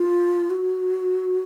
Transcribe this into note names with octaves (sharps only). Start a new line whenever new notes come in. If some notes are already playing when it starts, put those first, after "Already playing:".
Already playing: F4
F#4